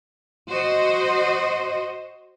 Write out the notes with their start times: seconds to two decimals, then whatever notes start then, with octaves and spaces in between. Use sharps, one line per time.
0.49 F#4 C5 D#5